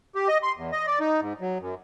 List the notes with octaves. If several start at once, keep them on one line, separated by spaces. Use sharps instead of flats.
G4
D#5
C6
E2
D#5
D5
D#4
G#2
F#3
F#2